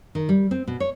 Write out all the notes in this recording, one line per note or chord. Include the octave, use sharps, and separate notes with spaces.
D#3
G3
C4
B2
C#5